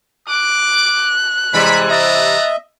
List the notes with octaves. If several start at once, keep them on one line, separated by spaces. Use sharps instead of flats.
D6 F#6
C3 E3 G3 G#3 B5
B3 D#5 E5 A5 A#5